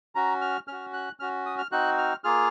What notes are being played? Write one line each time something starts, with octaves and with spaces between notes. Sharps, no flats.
C#4 F#4 A#5
F6
C#4 F#4 F6
F#6
C#4 F#4 F6
D#6
F6
C4 D#4 F#4 F#6
F6
A#3 F4 G#4 F6